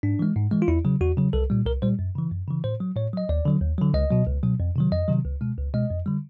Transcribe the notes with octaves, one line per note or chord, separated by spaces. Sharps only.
G#2 D4
E3 G#3
G#2
E3 G#3
F4
E2 E4
C#3 F#3
E2 F#4
C#3 F#3
C2 A4
A#2 G3
C2 A#4
A#2 G3 C5
F#2
C#3 E3
F#2
C#3 E3
A2 C5
F#3
A2 C#5
F#3 D#5
D#2 D5
D3 F#3
D#2
D3 F#3
C#2 D#5
B2 F#3
C#2
B2 F#3
F2
C3 D#3 F#3
F2 D#5
C3 D#3 F#3
C#2
B2 G#3
C#2
B2 G#3 D#5
F2
D3 G3